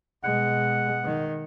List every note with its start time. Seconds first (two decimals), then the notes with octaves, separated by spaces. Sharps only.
0.24 B2 G#3 F#5
1.05 D#3